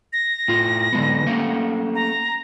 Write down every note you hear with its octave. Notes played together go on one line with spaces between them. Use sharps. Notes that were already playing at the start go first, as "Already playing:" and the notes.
A#6
A2 F4
D3 G#3 B3
A3 A#3 C#4
A#5